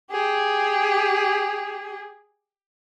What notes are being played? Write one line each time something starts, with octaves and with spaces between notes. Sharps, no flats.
G4 G#4